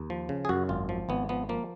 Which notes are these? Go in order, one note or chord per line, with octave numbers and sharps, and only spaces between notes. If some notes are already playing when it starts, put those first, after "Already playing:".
Already playing: D#2
F3
C#3
G#4
F#2 F#4
G#1 F4
F3
G#1 B3
F3 B3
F3 A#3